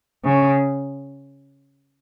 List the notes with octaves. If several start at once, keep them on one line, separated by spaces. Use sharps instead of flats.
C#3